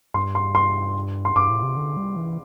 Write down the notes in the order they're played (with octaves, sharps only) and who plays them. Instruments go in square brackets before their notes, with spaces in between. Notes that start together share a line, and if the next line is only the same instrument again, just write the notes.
[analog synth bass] G2 [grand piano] C6
[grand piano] C6
C6
C6
[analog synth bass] G2 [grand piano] D6
[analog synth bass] A2
C3
D3
G3
E3